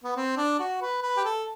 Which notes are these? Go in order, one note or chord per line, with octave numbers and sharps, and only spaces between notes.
B3
C4
D4
F#4
B4
B4
G4
A4